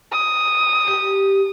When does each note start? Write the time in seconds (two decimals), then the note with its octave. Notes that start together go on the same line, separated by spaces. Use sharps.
0.12 D#6
0.88 G4